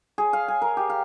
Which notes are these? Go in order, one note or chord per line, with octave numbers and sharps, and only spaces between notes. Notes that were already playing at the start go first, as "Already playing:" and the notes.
G#4
F5
G#5
A#4
G4
F5